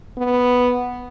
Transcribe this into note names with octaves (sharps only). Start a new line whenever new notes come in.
B3